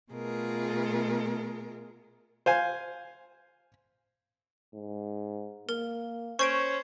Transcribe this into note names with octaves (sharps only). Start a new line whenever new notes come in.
B2 A3 F4 G#4 A#4
C5 F5 G#5
G#2
A#3 A#4
C#4 C5 C#6 G#6 D7